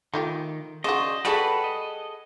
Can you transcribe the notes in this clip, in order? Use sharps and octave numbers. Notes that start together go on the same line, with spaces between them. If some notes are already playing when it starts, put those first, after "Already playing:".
D#3 A3 F4 G4
C#3 F#4 G#4 C5 D5 D#5
G3 F#4 G#4 A4 B4 F#5 B5
D#5